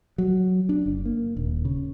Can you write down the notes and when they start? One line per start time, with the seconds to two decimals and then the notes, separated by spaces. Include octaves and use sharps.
0.18 F#3
0.69 D4
0.86 F#1
1.05 A#3
1.37 D#1
1.65 C#3